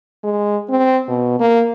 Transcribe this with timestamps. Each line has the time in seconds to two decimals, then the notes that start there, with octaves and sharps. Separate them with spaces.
0.24 G#3
0.70 C4
1.09 B2
1.40 A#3